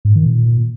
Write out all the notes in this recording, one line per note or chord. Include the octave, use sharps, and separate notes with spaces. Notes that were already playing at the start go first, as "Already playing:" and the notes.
G#2
D#3
A#2